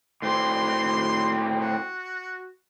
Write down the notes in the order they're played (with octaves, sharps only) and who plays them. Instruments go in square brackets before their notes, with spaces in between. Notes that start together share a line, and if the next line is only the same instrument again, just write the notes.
[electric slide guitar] A2 C4 [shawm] C6
[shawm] F#4